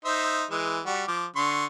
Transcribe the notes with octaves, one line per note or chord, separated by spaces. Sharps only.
D#4 C5 E5
E3 G#3
G3 F#4
F3 D6
D3 C6 C#6